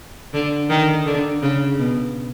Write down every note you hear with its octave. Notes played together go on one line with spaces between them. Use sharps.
D3
D#3
D3
C#3
B2